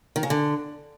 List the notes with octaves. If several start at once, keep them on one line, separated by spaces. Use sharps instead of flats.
D#3
C#3
D3